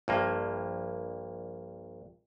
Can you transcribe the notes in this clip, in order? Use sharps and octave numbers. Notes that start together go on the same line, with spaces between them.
A#1 G2 A#3